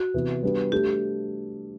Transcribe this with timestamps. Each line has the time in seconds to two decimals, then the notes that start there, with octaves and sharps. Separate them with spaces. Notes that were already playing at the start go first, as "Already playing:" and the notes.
Already playing: F#4
0.14 C3 E3 B3 E4
0.43 G3 B3 D4 G4 B4
0.72 A3 D4 G4 A4